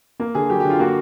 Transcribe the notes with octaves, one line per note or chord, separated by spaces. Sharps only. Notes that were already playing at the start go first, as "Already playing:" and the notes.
A#3
D3 G#4
F#3 G4
G4
D3
F4
A#3 F#4